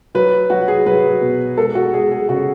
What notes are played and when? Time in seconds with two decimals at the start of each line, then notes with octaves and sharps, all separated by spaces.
0.15 F#3 B4
0.50 F#3 F#4
0.68 G#4
0.86 F#3 B4
1.21 B2
1.57 G#3 A4
1.75 F#4
1.93 G#3 G#4
2.11 G#4
2.29 C#3 F#4